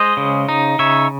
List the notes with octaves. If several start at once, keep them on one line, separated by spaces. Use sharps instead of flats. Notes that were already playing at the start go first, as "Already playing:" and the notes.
Already playing: G#3 C5 D#5
C#3
D#4
C#3 C#5 E5